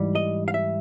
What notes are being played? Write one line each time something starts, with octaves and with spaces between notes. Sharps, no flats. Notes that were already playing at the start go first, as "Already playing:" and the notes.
Already playing: G#2 E3 G3
D#5
F5
E5